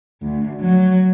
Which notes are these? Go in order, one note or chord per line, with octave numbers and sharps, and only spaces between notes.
D2
F#3